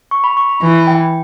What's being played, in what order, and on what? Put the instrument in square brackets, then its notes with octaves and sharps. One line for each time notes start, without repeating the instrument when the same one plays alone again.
[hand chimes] C#6
B5
C#6
B5
[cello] E3 [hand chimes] B5
[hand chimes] G5